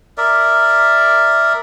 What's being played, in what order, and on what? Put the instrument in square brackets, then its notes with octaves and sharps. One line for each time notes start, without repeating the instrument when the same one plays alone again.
[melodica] A#4 D5 E5